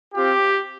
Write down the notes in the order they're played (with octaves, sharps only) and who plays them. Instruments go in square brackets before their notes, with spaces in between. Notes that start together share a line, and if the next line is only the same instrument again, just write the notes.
[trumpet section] C4 F4 G4